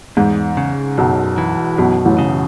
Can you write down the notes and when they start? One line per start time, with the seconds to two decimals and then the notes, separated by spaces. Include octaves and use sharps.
0.17 E2 G#2
0.57 C#3
0.98 B1 F#2 B2
1.38 E3
1.78 B1 F#2 B2
2.05 A1 A2
2.18 C#3